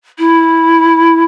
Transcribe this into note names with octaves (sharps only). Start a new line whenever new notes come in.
E4